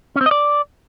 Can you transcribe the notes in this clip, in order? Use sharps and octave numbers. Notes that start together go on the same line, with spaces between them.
C#4
C4
D#5
D5